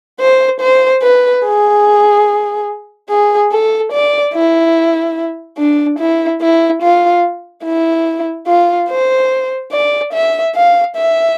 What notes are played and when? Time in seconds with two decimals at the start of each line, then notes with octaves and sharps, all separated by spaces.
0.20 C5
0.61 C5
1.02 B4
1.44 G#4
3.09 G#4
3.52 A4
3.92 D5
4.34 E4
5.58 D4
5.99 E4
6.41 E4
6.82 F4
7.64 E4
8.47 F4
8.89 C5
9.72 D5
10.13 E5
10.55 F5
10.96 E5